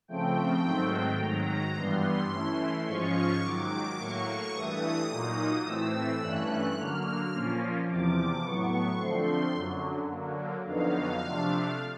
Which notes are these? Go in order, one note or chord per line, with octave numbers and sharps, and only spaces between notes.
C#3 F3 A3 C4 G5
G#2 D#3 F#3 A3 C4
G#2 D#3 F#3 A#5
G2 E3 G3 B3 C6
E3 A3 C#4 E4
G#2 F3 G#3 C#4 F4 C#6
G#2 D#3 F#3 D6
A2 F#3 A#3 C#6
G2 E3 A3 D#6
A#2 F#3 A#3 D#4
A2 E3 A3 C4 E6
G2 E3 A3 C#4 F#6
D3 F#3 A#3 F6
A#2 F3 A#3 C#4 F4
E2 C3 F3 D6
A2 F#3 B3 C#6
D3 F3 A3 C4 C6
F#2 D3 F#3
D3 F#3 A#3
F2 D3 F#3 B3 D#4 F5
C3 F3 A3 D4